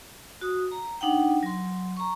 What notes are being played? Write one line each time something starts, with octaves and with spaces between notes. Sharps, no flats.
F#4 D#6
A#5
D4 D#4 F#5 G5
F#3 C6
A#5 C#6